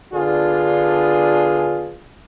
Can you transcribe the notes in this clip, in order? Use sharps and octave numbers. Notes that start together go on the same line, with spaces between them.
D3 B3 D4 F4 G#4